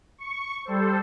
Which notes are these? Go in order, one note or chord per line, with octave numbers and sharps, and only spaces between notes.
C#6
G3 A4 C5